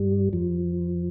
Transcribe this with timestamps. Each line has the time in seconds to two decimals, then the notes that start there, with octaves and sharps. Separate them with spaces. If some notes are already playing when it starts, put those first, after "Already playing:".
Already playing: G2 G3
0.33 F2 F3